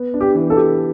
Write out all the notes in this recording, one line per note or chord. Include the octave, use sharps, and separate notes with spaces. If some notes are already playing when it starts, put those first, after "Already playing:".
Already playing: B3
D4
G4
E3
A4
G4